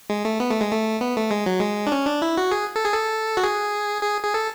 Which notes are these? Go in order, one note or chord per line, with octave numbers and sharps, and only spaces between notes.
G#3
A3
B3
A3
G#3
A3
B3
A3
G#3
F#3
G#3
D4
C#4
D4
E4
F#4
G#4
A4
G#4
A4
F#4
G#4
G#4
G#4
A4